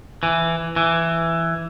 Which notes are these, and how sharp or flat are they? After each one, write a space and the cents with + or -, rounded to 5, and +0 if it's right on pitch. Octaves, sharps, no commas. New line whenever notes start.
E3 +10
E3 +10